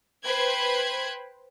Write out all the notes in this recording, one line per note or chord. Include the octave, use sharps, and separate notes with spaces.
B4 C5 G5 B5 F#6 G#6